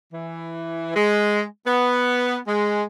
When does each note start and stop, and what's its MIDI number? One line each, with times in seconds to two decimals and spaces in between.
0.13 0.96 52
0.96 1.43 56
1.66 2.37 59
2.47 2.83 56